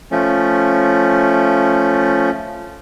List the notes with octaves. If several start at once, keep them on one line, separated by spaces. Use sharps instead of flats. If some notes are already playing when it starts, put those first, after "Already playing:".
F3 A3 C#4